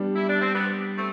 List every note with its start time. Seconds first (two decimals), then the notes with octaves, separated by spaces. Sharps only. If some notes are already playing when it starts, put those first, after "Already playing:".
Already playing: G3 B3 D4
0.15 E4
0.28 D4
0.40 C4
0.53 G3 B3
0.96 A3 C4